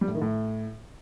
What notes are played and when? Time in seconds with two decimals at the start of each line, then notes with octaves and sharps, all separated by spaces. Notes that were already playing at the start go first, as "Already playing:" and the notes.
0.01 G3
0.08 A2
0.15 D#3
0.22 A2